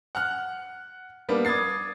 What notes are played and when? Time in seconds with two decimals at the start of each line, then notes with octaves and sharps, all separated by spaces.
0.15 F#5 F6 F#6
1.29 G3 A#3 B3 D4
1.45 D6 D#6 G#6 A6 C7